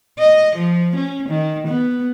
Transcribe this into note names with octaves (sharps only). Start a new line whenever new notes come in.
D#5
F3
C#4
D#3
B3